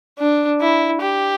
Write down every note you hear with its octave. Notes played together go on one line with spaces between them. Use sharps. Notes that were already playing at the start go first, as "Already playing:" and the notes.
D4
E4
G4